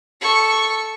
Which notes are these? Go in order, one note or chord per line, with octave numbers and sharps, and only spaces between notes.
A4 C#6